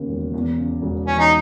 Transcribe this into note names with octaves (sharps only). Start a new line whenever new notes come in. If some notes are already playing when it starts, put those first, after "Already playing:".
Already playing: D#2 C#3
E1
E2
C#3
E1
E3 C#4
D#4